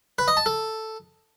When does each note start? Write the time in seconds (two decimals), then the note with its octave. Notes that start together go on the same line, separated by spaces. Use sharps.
0.19 B4
0.28 D#5
0.37 A5
0.46 A4